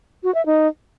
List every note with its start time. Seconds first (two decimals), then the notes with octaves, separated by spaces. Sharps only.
0.23 F#4
0.35 E5
0.46 D#4